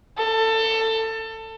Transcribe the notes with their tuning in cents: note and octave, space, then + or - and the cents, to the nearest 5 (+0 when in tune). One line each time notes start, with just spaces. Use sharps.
A4 +20